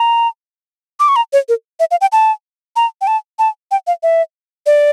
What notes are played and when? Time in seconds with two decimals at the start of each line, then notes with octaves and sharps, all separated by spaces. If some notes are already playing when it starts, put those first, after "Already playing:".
Already playing: A#5
1.00 D6
1.08 C#6
1.16 A#5
1.33 C#5
1.49 A#4
1.80 E5
1.91 F5
2.01 G5
2.12 A5
2.76 A#5
3.01 G5
3.07 A5
3.39 A5
3.71 G5
3.87 F5
4.03 E5
4.66 D5